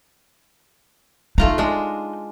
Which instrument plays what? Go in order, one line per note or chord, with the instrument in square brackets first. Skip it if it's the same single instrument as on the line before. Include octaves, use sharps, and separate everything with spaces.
[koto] A3 F4 A#5 [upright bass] D#4
[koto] G#3 D4